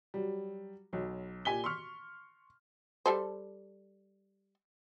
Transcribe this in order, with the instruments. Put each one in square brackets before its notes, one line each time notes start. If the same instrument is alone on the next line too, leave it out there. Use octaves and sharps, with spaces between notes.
[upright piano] F#3 G3
B1 F#3
A#2 G4 G#5 B6 G7
C6 C#6 F6
[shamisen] G3 A4 C5